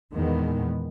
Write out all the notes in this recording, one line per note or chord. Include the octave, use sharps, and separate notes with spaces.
E2 A#2 D#3 G#3 B3